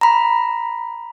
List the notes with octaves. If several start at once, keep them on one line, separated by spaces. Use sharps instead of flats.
A#5 B5